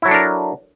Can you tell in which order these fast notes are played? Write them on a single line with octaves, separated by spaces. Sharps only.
E4 F#3 A4 D4 A#4